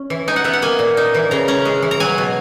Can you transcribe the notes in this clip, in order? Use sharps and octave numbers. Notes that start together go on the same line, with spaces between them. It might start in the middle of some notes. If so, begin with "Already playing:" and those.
Already playing: C#4
E3
D#4 G#5
F#5
B3 E5
F#5
A#3 G#5
A#2
D#4
E3
C#3 A#5
C#4 A#5
G#3
E3
A#5
F#3 G#5
B2